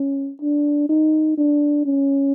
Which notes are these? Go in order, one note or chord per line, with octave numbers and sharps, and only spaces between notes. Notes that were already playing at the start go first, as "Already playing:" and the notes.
Already playing: C#4
D4
D#4
D4
C#4